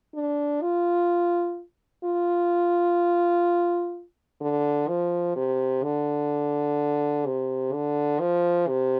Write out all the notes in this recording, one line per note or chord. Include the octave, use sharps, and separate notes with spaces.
D4
F4
F4
D3
F3
C3
D3
C3
D3
F3
C3